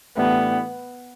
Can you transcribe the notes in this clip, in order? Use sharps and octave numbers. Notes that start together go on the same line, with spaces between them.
A2 E3 A3 B3 D4 G4